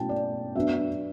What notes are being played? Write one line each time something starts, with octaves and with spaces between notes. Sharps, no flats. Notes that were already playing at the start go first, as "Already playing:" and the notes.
Already playing: B2 F#3 A3 C#4 E4 G5 A5
D5
F#3 B3 D4 E5